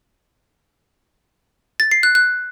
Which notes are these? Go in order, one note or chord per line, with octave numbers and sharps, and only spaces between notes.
A6
C7
F#6
F#6